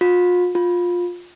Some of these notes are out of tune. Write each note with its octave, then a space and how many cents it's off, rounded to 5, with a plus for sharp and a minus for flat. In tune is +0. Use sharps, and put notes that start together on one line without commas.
F4 +40
F4 +15